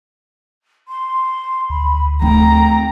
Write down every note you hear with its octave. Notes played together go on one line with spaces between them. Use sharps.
C6
D2 B5
A3 C4 G5 A#5